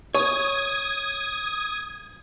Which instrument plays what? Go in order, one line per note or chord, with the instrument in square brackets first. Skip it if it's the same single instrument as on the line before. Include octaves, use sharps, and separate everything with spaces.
[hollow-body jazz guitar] C#5 [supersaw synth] D#6 G#6